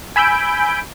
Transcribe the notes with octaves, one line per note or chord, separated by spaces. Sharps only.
G#5 B5 E6 G6 D7